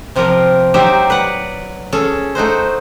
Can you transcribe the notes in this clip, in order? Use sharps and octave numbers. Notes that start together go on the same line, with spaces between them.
C3 F3 F4 G4 A#4
F#3 D#4 G4 C5 E5
B4 D5 F#5
C#4 G#4 A4
A3 D#4 F#4 C5